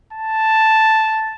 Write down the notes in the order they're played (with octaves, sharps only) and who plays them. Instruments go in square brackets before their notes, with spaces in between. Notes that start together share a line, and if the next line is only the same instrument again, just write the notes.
[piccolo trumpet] A5